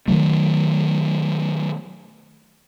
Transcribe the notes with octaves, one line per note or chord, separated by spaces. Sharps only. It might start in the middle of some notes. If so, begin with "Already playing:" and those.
D#3 E3 F#3 A3